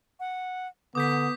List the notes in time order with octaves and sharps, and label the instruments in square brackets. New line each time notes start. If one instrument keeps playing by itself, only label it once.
[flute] F#5
[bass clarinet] D3 [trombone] B3 [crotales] D6 G6 B6 [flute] D#6